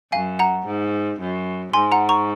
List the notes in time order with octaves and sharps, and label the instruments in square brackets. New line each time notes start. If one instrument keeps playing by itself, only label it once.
[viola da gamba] F#2 [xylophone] F5 G#5
[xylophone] F#5 A#5
[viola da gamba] G#2
F#2
[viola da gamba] G#2 [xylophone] G#5 C6
[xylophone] F#5 A#5
A#5 C#6